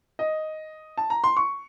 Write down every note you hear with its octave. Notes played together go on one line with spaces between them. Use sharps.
D#5
A5
A#5
C6
C#6